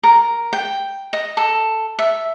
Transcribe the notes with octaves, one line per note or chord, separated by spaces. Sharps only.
A#4
G5
D#5
A4
E5